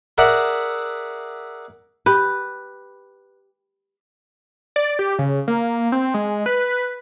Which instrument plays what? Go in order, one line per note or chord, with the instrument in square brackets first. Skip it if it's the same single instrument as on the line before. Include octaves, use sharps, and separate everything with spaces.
[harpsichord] G#4 A#4 D5 E5 F#5
[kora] G4 B4
[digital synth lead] D5
G4
C#3
A#3
C4
G#3
B4